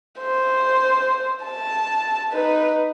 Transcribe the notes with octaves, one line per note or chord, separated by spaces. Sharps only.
C5
A5
D#4 B4